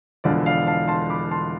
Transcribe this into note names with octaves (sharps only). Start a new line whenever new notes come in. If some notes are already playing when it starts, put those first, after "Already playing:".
E1 E2 D3 F3 D5 F5
D5 F5
F5 A5
A5 C6
B5 D6
A5 C6